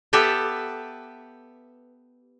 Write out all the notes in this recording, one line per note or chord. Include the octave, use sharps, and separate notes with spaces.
B3 G4 A4 B4 E5